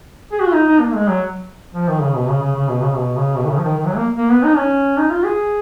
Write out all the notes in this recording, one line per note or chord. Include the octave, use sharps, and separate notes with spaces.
G#4
F#4
F4
D#4
D#4
A#3
G#3
F#3
F3
D#3
C#3
B2
C#3
C#3
C#3
B2
C#3
B2
C#3
B2
D#3
C#3
F3
D#3
D#3
F#3
A#3
A#3
B3
D#4
C#4
D#4
F4
G#4